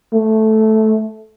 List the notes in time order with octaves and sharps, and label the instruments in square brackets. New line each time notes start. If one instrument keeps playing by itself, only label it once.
[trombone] A3